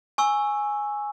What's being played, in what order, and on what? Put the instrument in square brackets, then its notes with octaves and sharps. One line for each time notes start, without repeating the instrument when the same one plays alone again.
[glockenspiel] G#5 C#6 E6